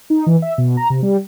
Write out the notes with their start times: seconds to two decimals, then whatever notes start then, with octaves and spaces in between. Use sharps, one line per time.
0.10 D#4
0.26 E3
0.42 E5
0.58 B2
0.77 A#5
0.90 C3
1.02 G3